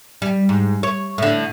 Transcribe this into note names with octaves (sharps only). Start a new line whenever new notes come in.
G3
G#2
C#5
A2 D3